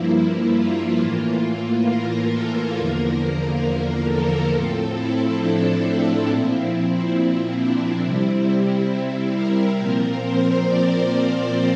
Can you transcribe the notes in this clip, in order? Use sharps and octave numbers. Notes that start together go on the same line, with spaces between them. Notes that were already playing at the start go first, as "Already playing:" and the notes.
Already playing: G2 F3 A#3 E4
F4
A2 E3 A#3
A#4
A4
E2 D3 F3 A#3 A#4
A4
A2 F3 C4
E4
D4
A#2 F3 C4 E4
E4
D4
C3 G3 C4 E4
E4
E4
A#4
A#2 F3 C4
C5
D5
C5